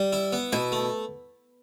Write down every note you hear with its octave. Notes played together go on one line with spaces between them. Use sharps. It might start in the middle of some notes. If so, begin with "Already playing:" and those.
Already playing: G3
E4
B3
B2 E4
A3